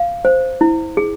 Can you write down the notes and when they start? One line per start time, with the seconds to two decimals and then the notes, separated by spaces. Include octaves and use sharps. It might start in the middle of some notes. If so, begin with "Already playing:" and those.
Already playing: F5
0.25 C5
0.61 E4
0.97 G#4